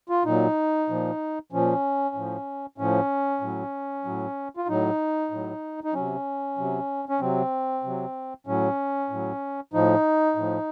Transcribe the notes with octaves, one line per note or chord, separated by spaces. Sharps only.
F4
A#2 F#3 D#4
A#2 F3
A#2 F3 C#4
A2 F3
A2 F3 C#4
A2 F#3
A2 F#3
F4
A2 F#3 D#4
A2 F#3
D#4
C3 F#3 C#4
C3 F#3
C#4
C3 F#3 C4
C3 F#3
A2 F#3 C#4
A2 F#3
A2 F3 D#4
A2 F3